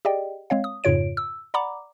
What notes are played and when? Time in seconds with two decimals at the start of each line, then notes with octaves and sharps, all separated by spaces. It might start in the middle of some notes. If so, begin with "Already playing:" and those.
0.05 G4 G#4 D5 D#5 G5
0.50 G#3 C4 C#5 F5
0.64 D#6
0.84 F2 G#2 C#3 F4 C#5 D7
1.17 E6
1.54 D5 F#5 A#5 B5 D6